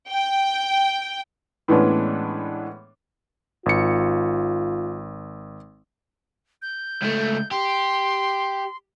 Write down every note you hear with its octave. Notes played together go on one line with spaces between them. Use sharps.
G5
A2 E3 G#3 B3 C#4 D4
G#1 F4 C#7
G6
C#2 A3
G4 C6